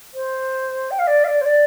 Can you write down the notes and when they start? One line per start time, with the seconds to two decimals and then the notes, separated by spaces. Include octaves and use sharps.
0.14 C5
0.91 G5
0.99 F5
1.07 D5
1.24 F5
1.28 D5
1.41 C5
1.45 D5